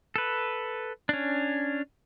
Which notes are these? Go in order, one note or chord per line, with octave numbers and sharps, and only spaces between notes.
A4 B4
C#4 D4